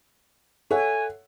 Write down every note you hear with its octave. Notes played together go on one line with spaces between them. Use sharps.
A4 C#5 E5 F#5 G#5